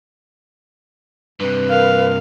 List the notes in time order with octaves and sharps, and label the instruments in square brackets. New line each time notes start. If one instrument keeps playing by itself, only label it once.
[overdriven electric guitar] G2 C3 [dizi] B4
[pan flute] A#4 [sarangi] F5